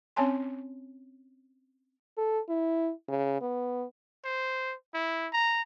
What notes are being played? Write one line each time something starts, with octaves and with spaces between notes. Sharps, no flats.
C4 C#4 C#5 G#5 A5 C6
A4
E4
C#3
B3
C5
E4
A#5